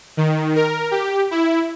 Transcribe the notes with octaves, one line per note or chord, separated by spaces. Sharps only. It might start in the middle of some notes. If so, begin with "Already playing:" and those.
D#3
A#4
G4
E4